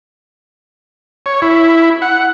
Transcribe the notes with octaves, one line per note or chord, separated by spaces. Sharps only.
C#5
E4
F#5